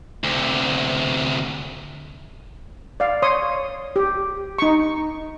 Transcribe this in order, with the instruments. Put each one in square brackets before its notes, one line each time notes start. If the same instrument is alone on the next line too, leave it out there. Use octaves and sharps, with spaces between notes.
[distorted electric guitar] D2 C3
[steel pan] D5 F5
C#5 C6 D#6
G4
D#4 C#6